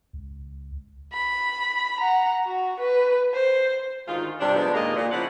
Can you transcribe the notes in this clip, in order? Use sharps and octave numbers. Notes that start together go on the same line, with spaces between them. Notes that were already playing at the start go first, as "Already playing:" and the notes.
C#2
B5
F#5 A#5
F#4
B4
C5
D2 G#2 D#3 F4
G2 C3 G3 D4
C3 F3 G#3 A#3 B3 D4
D#2 A#2 G#3 A#3 A#4 D#5
A#2
C#3 F3 E4 F5 F#5